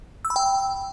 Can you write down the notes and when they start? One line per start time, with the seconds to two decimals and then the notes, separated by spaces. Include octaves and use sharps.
0.25 E6
0.30 B5
0.36 G5